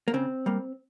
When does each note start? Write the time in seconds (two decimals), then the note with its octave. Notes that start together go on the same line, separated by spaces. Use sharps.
0.08 A#3
0.14 C#3 C4
0.46 G3 A#3